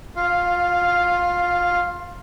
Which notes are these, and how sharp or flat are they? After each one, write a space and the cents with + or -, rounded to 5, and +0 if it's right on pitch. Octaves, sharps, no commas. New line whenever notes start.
F4 +20 F5 +0